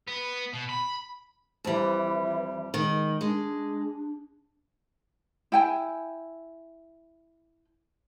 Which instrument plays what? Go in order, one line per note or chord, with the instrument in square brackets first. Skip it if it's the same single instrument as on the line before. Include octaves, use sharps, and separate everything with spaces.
[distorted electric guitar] B3
B2
B5
[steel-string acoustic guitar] F2 G3 [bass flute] E3
[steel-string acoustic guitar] D#3 [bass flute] G#3
[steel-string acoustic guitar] G#3 [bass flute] D4
[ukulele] E4 G5 G#5